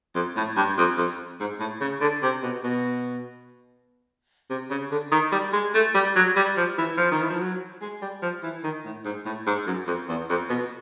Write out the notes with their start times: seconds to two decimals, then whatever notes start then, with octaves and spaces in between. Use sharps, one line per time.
0.15 F2
0.36 A2
0.56 G2
0.78 F2
0.98 F2
1.40 G#2
1.59 A2
1.81 C#3
2.01 D3
2.22 C3
2.43 B2
2.64 B2
4.50 C3
4.71 C#3
4.91 D3
5.11 D#3
5.32 G3
5.53 G#3
5.74 A3
5.94 G3
6.16 F#3
6.37 G3
6.57 F3
6.78 E3
6.98 F3
7.12 D#3
7.21 E3
7.30 F3
7.39 F#3
7.82 G#3
8.02 G3
8.22 F3
8.43 E3
8.64 D#3
8.85 A2
9.05 G#2
9.25 A2
9.47 G#2
9.67 F#2
9.87 F2
10.09 E2
10.30 F2
10.50 B2